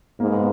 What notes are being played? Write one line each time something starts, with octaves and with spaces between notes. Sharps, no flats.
G#2 A#3
B3
A#3